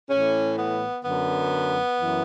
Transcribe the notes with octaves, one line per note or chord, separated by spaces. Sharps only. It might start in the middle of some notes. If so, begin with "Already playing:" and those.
A2 E3 C#4
B3
F#2 D3 B3
F#2 E3